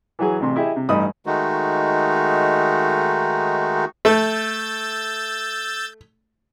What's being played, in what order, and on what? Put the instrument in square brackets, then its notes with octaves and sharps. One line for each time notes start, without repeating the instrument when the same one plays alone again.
[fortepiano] E3 F#3 G#4
A1 C3 C6
E4 G4 G#4 D#5 E5
C3
A1 G2 D#4 B5 D#6
[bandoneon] D#3 G#3 A3 D#4 F#4
[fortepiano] A3 [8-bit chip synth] E6 G6 A6